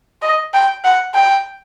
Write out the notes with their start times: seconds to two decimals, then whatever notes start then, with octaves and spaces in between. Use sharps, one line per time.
0.22 D#5
0.54 G5
0.84 F#5
1.14 G5